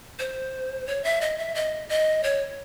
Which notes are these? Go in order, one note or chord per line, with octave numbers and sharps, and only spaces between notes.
C5
C#5
E5
D#5
E5
D#5
D#5
C#5